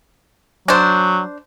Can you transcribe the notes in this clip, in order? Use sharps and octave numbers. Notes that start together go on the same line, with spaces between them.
F#3 D4 C5